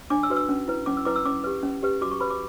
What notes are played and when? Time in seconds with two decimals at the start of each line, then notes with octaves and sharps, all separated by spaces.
0.10 D4 D6
0.23 E6
0.30 F#4 B4
0.36 E6
0.49 C#4
0.68 E4 B4
0.86 C#4 D6
0.97 E6
1.05 E4 B4 D6
1.16 E6
1.25 C#4 D6
1.44 G4 B4
1.63 C#4
1.83 G4 B4
2.01 F#4 D6
2.11 C#6
2.20 B4 B5
2.30 D6